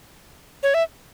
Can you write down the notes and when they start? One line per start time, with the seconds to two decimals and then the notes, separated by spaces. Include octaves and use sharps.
0.63 C#5
0.74 E5